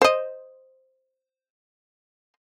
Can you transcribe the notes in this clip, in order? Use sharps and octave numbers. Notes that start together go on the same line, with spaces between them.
C5 D#5